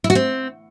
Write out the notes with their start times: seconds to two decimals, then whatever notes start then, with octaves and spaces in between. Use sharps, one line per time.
0.04 E4
0.10 F#4
0.15 C4